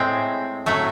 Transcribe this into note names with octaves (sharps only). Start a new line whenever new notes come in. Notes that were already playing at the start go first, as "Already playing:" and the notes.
Already playing: A2 G#3 C4
A2 F#3 A3